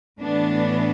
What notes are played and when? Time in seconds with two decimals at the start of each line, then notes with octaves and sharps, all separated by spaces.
0.20 A2 E3 B3 D4